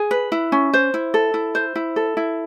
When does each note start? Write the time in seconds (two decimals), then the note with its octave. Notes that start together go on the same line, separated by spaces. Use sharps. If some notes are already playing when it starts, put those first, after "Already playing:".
Already playing: G#4
0.11 B4
0.32 E4
0.52 C#4
0.73 C5
0.94 E4
1.14 A4
1.34 E4
1.55 C5
1.76 E4
1.96 A4
2.17 E4